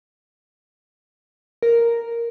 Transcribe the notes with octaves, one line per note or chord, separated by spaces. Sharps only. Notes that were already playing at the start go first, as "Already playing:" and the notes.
A#4